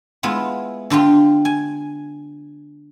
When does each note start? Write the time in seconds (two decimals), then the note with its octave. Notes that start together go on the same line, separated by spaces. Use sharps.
0.23 G#3 B3 E4 F4
0.90 D3 D4 F4 G4
1.45 G#5